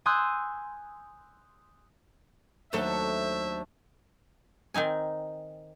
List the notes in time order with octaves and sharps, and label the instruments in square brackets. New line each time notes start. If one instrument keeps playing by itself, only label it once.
[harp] G#5 C6 D#6 E6 F#6 G6
[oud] D#2 F#3 A4 [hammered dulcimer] A3 D4 [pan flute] C5 [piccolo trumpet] E5
[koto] D#3 C4 D#4 G#5